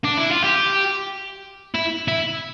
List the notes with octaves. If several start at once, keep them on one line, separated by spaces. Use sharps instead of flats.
D4
E4
F4
G4
E4
E4